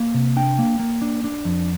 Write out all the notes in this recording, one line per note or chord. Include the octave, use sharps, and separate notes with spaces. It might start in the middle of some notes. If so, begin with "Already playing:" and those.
Already playing: A#3
C3
D4 G5
A#3
A#3
D4
D4
F2